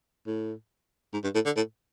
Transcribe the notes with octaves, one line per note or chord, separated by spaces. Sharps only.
A2
G#2
G2
A2
D3
A2